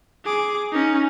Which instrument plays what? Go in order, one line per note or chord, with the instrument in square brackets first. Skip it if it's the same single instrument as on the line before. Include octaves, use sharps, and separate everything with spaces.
[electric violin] G#4 D6
C#4 D#4